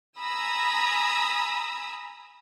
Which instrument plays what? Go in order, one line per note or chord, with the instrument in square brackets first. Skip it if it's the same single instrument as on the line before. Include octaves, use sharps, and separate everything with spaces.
[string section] G#5 A#5 B5 D#6 E6